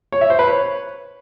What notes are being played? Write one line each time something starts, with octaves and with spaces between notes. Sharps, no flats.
C#5
E5
C5
B4
C#5